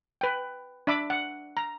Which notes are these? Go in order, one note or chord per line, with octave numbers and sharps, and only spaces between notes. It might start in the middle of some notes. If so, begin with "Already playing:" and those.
B4 G5
D4 E5 B5 D6
F#5
A#5